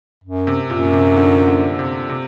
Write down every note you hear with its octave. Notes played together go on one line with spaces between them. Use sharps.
F#2
C3
F#2 A#2
C3
D3
D3
C3
C3